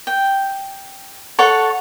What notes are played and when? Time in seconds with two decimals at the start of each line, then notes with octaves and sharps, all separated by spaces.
0.07 G5
1.39 A4 C#5 F#5 A5